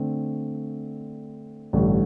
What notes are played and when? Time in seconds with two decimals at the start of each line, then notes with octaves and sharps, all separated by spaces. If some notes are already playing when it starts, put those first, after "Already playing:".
Already playing: D3 A3 C4
1.73 A1 G2 D3 A3